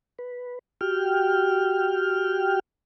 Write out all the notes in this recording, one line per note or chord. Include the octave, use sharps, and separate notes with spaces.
B4
F#4 G4 G5 F6